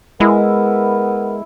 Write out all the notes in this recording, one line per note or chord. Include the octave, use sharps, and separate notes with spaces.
G#3 B3 E4 A#4